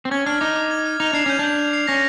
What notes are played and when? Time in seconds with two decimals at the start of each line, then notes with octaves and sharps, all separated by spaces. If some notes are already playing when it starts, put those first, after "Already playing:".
0.05 C4
0.11 C#4 G#6
0.26 D4 F6
0.41 D#4 D6
0.56 D6
0.71 G#6
0.86 F6
1.00 D#4 F7
1.13 D4 C7
1.26 C#4 G6
1.39 D4 G6
1.59 F7
1.73 C7
1.87 C#4 A#6